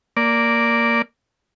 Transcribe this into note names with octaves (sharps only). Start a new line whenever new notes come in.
A#3 D5